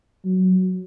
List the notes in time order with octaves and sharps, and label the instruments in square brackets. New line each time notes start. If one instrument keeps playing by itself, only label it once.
[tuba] F#3